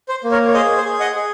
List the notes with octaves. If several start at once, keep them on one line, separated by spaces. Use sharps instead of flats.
C5
A#3
A#4 C#5
C#5
G#4 C5 D#5
C5
G#4
D#5 F#5
G#4